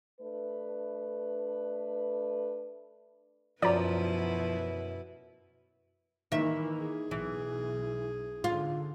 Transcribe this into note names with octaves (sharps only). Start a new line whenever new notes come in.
A3 D4 B4
F#2 B2 F3 E4 B4 D5 A#5
D#3 E3 A#3 E5
G#4
B1 E3
G#2 D3 F4